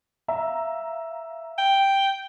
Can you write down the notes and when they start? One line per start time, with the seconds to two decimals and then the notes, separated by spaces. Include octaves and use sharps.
0.28 E5 F5 A#5
1.58 G5